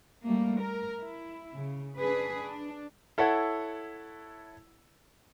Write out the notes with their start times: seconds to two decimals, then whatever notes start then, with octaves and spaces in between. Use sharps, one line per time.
0.24 G3 A3 A#3
0.61 A#4
1.02 E4
1.56 C#3
1.98 D4 G#4 B4
2.41 D4
3.18 E4 A4 C#5 E5 F#5